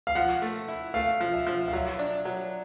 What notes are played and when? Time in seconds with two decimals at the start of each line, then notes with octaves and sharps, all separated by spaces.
0.07 F5
0.15 F3 F#5
0.42 A3
0.68 E4
0.94 A3 F5
1.20 F3
1.33 E5
1.46 F3
1.68 F5
1.73 F#3 E5
1.99 D4
2.25 F#3